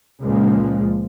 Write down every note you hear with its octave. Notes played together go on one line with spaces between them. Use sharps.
C#2 A#2 F3 G#3